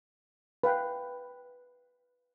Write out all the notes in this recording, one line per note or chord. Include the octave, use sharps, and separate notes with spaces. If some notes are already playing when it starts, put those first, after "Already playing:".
B4 F5 G5